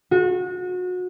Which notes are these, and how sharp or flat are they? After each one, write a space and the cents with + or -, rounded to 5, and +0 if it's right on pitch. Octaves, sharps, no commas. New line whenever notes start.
F#4 -30